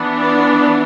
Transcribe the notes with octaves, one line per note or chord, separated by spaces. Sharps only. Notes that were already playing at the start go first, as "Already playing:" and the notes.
Already playing: E3 B3 D4
D5